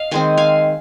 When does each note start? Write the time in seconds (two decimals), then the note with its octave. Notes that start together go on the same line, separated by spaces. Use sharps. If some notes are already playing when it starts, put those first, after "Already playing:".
Already playing: D#5 F5
0.11 D#3 G#3 C4 G#5
0.37 F5 G#5